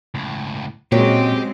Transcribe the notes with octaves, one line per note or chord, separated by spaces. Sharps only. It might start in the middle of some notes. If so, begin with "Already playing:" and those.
C#2 A2
A#2 C#3 F#3 G#3 C4 G4